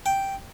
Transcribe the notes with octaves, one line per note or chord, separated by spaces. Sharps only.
G5